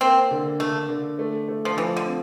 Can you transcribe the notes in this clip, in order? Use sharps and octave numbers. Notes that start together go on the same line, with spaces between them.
A#3 C4
D3
D3 A3
D3
A3
A3
F3
E3 F3
D3
C4